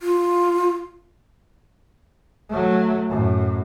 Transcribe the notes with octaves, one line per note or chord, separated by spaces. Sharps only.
F4
F#3 A3
F#2 A2